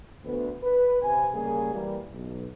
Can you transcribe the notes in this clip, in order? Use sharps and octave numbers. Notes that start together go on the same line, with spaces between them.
D2 B3
B4
C3 B4 G#5
C#3 G3 A#3 G#4 G#5
E3 G3 A#3
B1